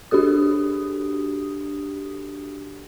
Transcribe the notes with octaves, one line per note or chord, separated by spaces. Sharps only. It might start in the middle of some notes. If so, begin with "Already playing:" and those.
D4 F#4 G4 A4 D#6